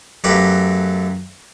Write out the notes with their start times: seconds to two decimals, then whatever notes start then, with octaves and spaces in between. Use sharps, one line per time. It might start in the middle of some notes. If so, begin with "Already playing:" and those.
0.24 F#2 A3 G4 B4 F5 A#5